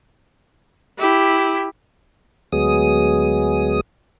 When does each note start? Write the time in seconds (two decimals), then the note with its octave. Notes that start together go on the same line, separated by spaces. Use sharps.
0.98 E4 G4
2.52 D2 F#3 G#3 B3 G#4 D#6